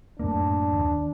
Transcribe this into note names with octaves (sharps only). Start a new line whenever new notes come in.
F#2 A2 A#3 D4
D#2